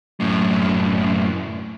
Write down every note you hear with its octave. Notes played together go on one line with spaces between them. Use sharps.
F#2 A2